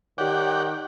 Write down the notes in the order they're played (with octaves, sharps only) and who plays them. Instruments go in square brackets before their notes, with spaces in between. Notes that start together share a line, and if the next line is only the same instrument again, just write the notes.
[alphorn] D#3 [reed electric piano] G4 C#5 [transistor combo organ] D5 F#5 G5